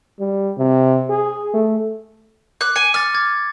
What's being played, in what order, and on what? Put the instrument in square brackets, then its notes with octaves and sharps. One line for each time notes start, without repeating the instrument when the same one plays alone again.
[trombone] G3
C3
G#4
A3
[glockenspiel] D6 [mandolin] F#6
[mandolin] G#5 [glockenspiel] C#7
[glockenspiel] D6 A6 [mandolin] F6
[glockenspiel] D6 G#6 A6